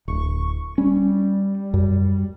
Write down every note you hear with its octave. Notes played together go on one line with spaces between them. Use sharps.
D1 C#6
G3 C#4
F#2